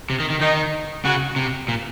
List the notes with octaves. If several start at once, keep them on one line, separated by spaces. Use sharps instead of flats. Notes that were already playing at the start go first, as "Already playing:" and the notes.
C3
D#3
D#3
D#3 D#4
C#3 F#4
C3
A#2